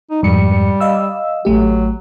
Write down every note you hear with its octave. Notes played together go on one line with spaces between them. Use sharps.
D#4
F2 G#2 G3 C#7
D#5 F5 E6
A1 F#3 A3 G4